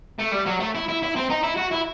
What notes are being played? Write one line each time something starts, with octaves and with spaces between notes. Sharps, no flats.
A3
G3
F#3
A3
E4
E4
E4
C4
D#4
E4
F#4
E4